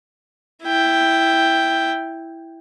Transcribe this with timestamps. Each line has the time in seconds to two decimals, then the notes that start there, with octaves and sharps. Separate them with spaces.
0.64 E4 G5